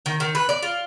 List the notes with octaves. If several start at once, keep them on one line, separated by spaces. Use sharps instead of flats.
D#3
D#3
B4
D5
F4